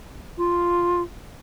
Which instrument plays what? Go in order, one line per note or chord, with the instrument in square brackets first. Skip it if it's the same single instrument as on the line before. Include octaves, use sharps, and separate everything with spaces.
[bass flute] F4